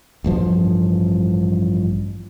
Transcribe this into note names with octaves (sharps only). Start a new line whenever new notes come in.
A1 G2 F3